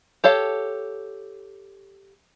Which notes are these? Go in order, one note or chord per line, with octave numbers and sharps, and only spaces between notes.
G4 A4 C#5 F5